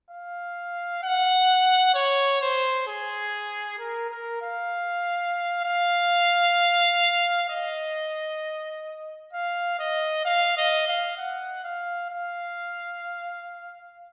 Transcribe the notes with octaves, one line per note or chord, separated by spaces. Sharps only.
F5
F#5
C#5
C5
G#4
A#4
A#4
F5
F5
D#5
F5
D#5
F5
D#5
F5
F#5
F5
F5